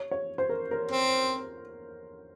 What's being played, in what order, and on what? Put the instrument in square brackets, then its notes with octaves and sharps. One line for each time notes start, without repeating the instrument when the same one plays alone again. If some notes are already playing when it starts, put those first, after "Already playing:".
Already playing: [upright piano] C#5
C#5
C5
A#4
A#4
[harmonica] C4